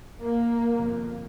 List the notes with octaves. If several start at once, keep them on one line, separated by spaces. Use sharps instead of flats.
A#3
G1 F2 C3